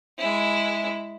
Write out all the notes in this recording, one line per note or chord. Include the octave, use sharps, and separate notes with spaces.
G#3 E4